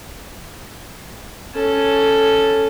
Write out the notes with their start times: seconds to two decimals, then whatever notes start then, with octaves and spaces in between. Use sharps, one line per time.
1.55 C#4 A4